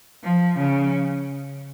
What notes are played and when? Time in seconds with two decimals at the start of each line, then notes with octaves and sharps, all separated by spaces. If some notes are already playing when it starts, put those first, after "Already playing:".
0.23 F3
0.58 C#3